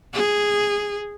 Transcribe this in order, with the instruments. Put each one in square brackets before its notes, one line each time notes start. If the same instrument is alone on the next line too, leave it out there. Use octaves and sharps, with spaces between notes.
[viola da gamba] G#4